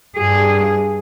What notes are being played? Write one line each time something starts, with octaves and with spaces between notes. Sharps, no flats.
G2 G#4